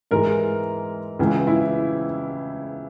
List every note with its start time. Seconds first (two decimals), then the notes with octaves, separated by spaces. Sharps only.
0.11 G#2 E3 G#3 A#4
1.19 C#2 C#3 E3
1.47 E4